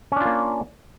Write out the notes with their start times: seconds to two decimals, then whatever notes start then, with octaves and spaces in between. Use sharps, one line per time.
0.12 C#4
0.16 D4
0.21 F4
0.25 A#3